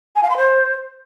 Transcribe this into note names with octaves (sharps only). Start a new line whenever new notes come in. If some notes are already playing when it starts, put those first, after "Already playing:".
G#5
F5
C6
C5